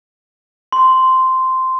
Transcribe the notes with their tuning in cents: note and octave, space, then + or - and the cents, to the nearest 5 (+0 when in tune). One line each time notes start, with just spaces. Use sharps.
C6 -10